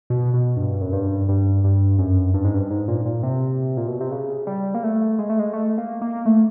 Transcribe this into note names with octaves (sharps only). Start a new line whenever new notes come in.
B2
B2
G2
F#2
G2
G2
G2
F#2
G2
G#2
G2
G#2
A#2
A#2
C3
A#2
B2
C3
C#3
G3
A#3
A3
G#3
A3
G#3
A3
A#3
A#3
A3